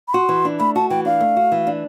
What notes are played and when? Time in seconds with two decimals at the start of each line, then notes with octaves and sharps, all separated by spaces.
0.08 B5
0.14 F#4 C6
0.29 E3
0.45 D4
0.60 A3 B5
0.76 F#4 A5
0.90 E3 G5
1.05 D4 F5
1.21 A3
1.37 F#4
1.52 E3
1.67 D4